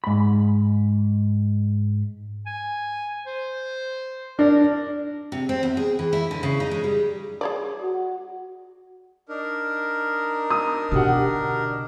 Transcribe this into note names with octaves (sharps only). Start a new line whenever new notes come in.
G#2 B5
G#5
C5
D4 A#4
C3
C4
E2
G#4
E3
E4
D3
C#3
D#4
G#3
G3
G#4 C#5 D5
F#4
D4 D#4 A#4
D#6
B2 D3 F#4 G4 F#5